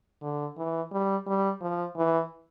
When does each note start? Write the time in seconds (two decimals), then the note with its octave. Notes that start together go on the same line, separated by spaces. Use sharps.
0.21 D3
0.57 E3
0.92 G3
1.27 G3
1.61 F3
1.96 E3